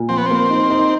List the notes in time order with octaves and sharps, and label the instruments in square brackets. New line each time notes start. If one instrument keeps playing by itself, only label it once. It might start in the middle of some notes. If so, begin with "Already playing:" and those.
Already playing: [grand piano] A#2
[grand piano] F3 [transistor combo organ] C4
[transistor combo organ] B3
[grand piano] A#3 [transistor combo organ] C4
[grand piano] D#4
D#4